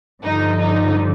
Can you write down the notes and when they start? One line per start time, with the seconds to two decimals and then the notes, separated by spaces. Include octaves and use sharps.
0.23 G2 D3 F3 D#4
0.59 D#4